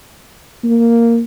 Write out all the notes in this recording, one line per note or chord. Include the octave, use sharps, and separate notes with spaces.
A#3